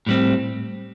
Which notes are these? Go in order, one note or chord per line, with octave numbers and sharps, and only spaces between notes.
A2 G3 C4